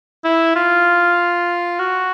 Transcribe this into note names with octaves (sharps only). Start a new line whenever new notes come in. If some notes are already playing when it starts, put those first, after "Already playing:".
E4
F4
F#4